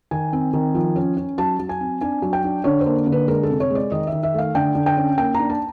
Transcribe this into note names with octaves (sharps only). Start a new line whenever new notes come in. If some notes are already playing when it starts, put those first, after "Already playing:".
D#3 G#5
C4
D#3
F3
C#4
C#4
F#3 A5
F#3
G#5
C4
D4 G#5
F#3
G5
D4
D3 C#5
C5
A#3
D3
B4
G#3 A#4
A4
C3
C#5
G#3
D5
D#3 D#5
E5
D#3
E5
A3 F5
D3 G5
D3
G5
C#4
A#3 G5
D4 A#5
A5